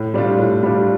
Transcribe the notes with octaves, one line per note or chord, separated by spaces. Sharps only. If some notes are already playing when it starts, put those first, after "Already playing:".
Already playing: A2
G3 D4 F4
A2
G3 D4 F4